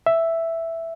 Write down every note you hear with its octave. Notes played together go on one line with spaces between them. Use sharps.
E5